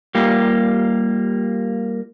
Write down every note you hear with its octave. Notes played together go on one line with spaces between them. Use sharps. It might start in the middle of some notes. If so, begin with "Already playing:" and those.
G3 A#3 F4 G4